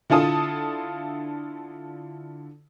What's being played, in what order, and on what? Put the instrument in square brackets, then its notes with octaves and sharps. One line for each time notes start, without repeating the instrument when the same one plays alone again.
[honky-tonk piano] D3 E4 F4 A4 D#6